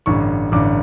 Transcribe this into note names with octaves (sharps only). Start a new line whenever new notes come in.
A1 G2 D3 C#6
A1 G2 D3 D6